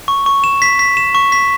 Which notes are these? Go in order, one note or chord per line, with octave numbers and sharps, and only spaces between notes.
C#6
C#6
E7
B6
B6
E7
C#6
B6